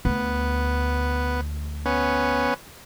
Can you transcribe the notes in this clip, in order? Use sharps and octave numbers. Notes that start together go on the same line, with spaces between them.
D2 B3
B3 C#4